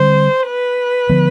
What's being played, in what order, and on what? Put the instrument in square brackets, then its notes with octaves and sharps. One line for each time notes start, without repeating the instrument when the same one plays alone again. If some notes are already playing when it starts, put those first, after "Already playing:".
Already playing: [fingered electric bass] D3 G3 C4 [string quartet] C5
[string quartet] B4
[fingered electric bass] D3 F3 B3